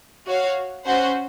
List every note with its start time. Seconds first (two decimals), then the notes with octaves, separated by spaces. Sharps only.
0.26 F#4 C#5 F5
0.85 C#4 F#4 C5 F#5